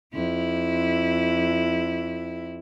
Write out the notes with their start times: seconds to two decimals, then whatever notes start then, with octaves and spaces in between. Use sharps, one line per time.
0.14 F2 E4